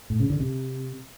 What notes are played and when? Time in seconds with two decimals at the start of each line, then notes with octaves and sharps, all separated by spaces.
0.10 A2
0.20 C#3
0.30 D3
0.40 C3